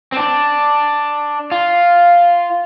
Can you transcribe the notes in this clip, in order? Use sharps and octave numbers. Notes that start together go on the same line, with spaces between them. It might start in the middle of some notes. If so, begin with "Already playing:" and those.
C4
D4
F4